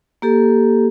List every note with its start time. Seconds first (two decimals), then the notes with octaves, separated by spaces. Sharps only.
0.22 A#3 G4 A4